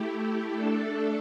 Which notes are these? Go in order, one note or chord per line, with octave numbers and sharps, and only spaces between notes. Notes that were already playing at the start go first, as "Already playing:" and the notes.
Already playing: A3 E4 G4
A3 D4 A4